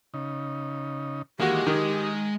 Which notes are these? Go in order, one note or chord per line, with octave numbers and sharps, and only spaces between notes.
C#3 D#4
D#3 E3 G#3 A#3 F#4 G4
D#3 D#4